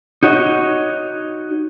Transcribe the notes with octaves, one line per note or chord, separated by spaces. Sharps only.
D#4 F#4 C#5 D#5